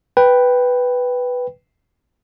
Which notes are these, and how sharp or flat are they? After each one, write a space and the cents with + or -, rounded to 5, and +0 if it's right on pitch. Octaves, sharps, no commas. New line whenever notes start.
B4 +0 G5 +0